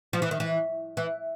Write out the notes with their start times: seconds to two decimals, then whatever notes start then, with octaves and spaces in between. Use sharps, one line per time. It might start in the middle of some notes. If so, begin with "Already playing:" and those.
0.13 F3
0.22 E3
0.31 D#3
0.40 E3
0.97 E3